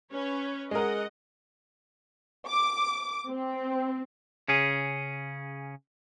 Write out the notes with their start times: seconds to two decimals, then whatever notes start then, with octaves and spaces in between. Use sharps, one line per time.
0.12 C#4 B4 C#5
0.71 G#3 A#4 D#5 F#5
2.48 D6
3.29 C4
4.48 C#3 C#4 G#4